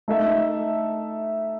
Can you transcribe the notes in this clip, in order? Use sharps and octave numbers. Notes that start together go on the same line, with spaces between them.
A3 D#4 A4 E5